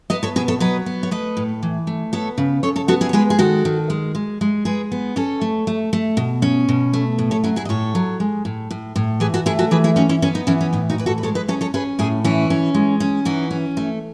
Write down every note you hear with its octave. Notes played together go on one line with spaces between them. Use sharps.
B3 B4 D#5
A4 C#5
B2 G#4 B4
A4 C#5
F#3 B4 D#5
B3
C#5
A3 B4 D#5
A2
E3
A3
B3 A4 C#5
C#3
C#3 A4 C#5
A4 C#5
B3 F#4 A4
E4 G#4
C#5
G#3 G#4 B4
G#4
D#3 F#4 A4
D#3
G#3
G#3
G#3
G#3 G#4 B4
B3
C#4 A4 C#5
A3
A3
A3
B2
C#4
B2
A3
A2
A4 C#5
F#3 C#4 E4
E4 G#4
D#5
A2 A4 C#5
F#3
G#3
A2
A2
A2
E3 G#4 B4
F#4 A4
A3 E4 G#4
F#4 A4
E3 G#4 B4
E4 G#4
C#4 D#4 F#4
C#4 E4
B3 C#4
D#4
E3 C#4 E4
C#4
A2 D#4
D#4 F#4
E3 B4
F#4 A4
B4
G#3 A4 C#5
B4 D#5
C#4 A4 C#5
A4 C#5
C#4 G#4 B4
A2 E4 G#4
E3 C#4 E4
C#4
G#3
C#4
E3 D#4 F#4
C#4
A3